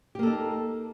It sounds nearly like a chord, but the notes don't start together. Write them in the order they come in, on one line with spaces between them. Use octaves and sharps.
G4 A#3 A4 D#4